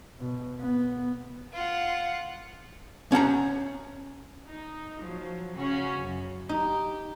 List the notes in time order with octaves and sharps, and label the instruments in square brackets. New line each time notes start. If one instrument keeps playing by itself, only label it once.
[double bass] B2
B3
[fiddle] F4 F#5
[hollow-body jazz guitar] C#4 F#5 A5 A#5
[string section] D#4
F3 F#3
C#3 C#4 F#4
F#2
[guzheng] D#4 [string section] G4